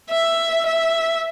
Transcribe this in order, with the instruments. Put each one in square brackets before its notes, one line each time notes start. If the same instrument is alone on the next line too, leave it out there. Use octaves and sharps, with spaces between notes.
[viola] E5
E5